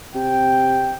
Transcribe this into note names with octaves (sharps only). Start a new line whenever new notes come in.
C3 G5